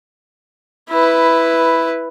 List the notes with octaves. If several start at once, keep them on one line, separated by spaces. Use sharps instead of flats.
E4 B4